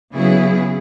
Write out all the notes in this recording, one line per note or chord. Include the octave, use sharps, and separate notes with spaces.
C#3 F#3 B3 E4 G#4